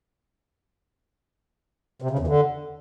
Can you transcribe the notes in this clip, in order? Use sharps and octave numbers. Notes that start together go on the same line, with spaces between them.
C3
C#3
E2
D3